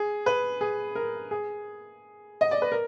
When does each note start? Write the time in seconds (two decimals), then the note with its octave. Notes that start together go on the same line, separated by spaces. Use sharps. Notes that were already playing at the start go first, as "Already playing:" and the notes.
Already playing: G#4
0.26 B4
0.61 G#4
0.95 A#4
1.31 G#4
2.41 D#5
2.51 D5
2.62 B4
2.72 A#4